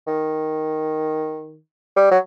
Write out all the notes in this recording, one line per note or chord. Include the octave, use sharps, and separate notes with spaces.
D#3
G3
F#3